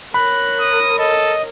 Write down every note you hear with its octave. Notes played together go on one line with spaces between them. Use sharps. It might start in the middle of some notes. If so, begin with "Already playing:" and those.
A#4 C#5 B5 F#6
D#6
A4 D#5